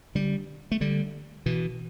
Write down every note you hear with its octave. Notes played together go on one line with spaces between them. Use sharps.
D3 G3
A3
D3 G3
B2 E3